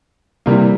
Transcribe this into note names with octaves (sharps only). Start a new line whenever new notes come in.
C3 E3 G3 A#3